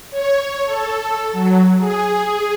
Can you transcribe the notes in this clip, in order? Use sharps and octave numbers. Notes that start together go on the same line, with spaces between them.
C#5
A4
F#3
G#4